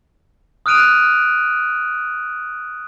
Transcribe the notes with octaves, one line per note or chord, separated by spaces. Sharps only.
D#6 F6 F#6 D7 D#7 F7